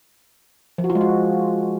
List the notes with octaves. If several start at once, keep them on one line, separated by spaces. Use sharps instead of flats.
F3
F#4
F4
G#3
F#4